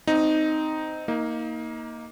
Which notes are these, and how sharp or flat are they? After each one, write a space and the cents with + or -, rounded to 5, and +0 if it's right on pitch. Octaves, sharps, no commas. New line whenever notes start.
C4 -20 D#4 +0
A#3 +0 D#4 +25